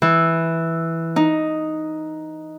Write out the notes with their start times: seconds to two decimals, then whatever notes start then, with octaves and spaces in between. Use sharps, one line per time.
0.02 E3
1.16 D#4